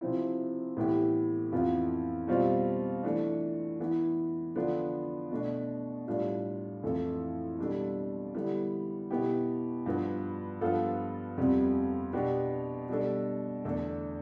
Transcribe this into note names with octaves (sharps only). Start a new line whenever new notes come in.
C3 F3 C4 E4
A2 E3 B3 E4 G4
F2 E3 B3 F4
B2 G3 C4 F4
E3 A3 D4
E3 B3 E4
D3 F3 B3 D4
B2 A3 D4
A2 G3 D4 F4
F2 E3 A3 E4 A4
B2 G3 D4 A4
D3 G3 B3 E4
B2 B3 E4 G4
G2 F3 B3
G2 F3 B3 F4 A4
F2 C3 G3 B3
B2 B3 D4 G4
B2 G3 D4 A4
E2 D3 A3 D4 A4